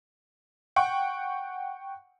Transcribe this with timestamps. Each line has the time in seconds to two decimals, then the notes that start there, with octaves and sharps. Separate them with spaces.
0.76 F#5 G5 C#6